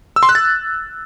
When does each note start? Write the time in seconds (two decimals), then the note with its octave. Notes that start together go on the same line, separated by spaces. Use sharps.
0.16 E6
0.23 C6
0.29 F#6
0.35 A6